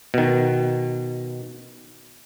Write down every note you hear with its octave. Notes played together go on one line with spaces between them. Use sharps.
B2 D#3